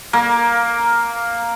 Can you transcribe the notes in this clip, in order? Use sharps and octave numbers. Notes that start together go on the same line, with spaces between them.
A#3